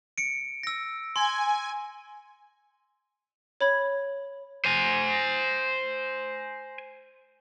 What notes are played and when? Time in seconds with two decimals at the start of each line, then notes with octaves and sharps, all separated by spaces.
0.18 C#7 D7
0.63 E6 A#6
1.16 G#5 C6
3.61 C#5 B5 G#6
4.65 C5 G#5